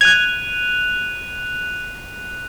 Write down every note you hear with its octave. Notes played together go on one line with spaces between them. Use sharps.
F#6 G#6 D#7 F7